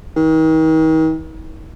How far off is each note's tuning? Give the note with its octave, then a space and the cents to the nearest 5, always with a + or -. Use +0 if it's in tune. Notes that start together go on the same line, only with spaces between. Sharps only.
D#3 +40